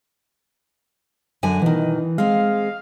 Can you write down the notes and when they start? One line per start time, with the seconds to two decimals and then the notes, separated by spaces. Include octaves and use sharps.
1.43 F#2 D3 G#5
1.62 B2 D#3 E3
2.18 G#3 C4 F5